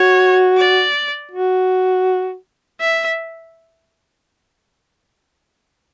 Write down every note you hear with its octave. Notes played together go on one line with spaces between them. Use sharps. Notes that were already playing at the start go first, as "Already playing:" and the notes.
Already playing: F#4 C#5
D5
F#4
E5